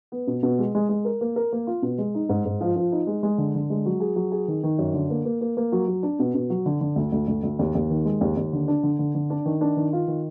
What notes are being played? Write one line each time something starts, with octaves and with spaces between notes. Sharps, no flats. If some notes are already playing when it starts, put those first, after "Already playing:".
B3
B2
B2
G#3
G#3
G#3
A#4
A#3
A#4
A#3
F4
B2
G#3
D#4
G#2
G#2
F3
F3
D#4
G#3
G#3
D3
D3
G#3
F#3
G#4
F#3
G#4
D#3
D#3
F#2
D3
A#3
A#3
A#3
A#3
F#3
F#3
D4
B2
B2
F#3
D3
D3
D2
D2
D2
D2
D#2
D#2
D#3
G#3
D#2
D#2
D3
D4
D3
D3
D3
D4
D#3
D4
D#3
F4
D#3